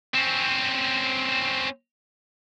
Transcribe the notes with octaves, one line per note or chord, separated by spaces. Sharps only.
C4 C#4